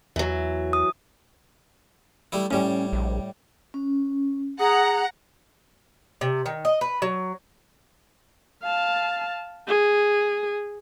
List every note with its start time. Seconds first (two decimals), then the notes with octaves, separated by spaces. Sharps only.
0.16 E2 E3 F#3
0.73 D#6
2.32 G3 A3 E4
2.51 A2 G3 C#4
2.93 A#1
3.74 C#4
4.59 G#4 F#5 A#5 D#6
6.21 C3
6.46 D#3
6.65 D#5
6.81 B4
7.02 F#3
8.63 F5 A5
9.68 G#4